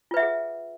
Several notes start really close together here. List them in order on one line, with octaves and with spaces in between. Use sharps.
F4 B4 E5 F#5 G#4